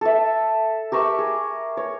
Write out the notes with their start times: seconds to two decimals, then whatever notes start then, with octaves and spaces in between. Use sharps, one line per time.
0.01 A4 E5
0.92 G4 A#4 C#6 E6
1.19 G#4
1.77 C#5